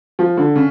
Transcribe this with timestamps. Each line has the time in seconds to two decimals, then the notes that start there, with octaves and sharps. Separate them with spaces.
0.19 F3
0.37 D3
0.56 C#3